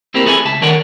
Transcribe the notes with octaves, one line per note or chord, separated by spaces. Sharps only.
A#3 C4 E4 G4 A#4 C5
G#4 A4 B4 E5 G5 G#5
C#2 E5 A5
D3 D#3 A#4 C#5 D5 F#5